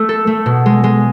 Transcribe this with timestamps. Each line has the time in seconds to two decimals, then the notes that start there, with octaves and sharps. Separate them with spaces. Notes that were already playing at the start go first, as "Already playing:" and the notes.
Already playing: A3
0.09 A4
0.27 A3
0.46 B2
0.66 G#3
0.84 G#3